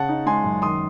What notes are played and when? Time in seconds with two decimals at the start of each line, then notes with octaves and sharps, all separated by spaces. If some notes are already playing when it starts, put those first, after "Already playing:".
Already playing: C#3 F#5 A5
0.09 D#4
0.26 G#3 G#5 C6
0.44 F#2
0.62 D#3 C6 D#6